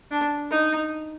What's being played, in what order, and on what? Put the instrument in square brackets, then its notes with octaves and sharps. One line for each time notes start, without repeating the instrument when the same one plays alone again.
[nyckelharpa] D4
D#4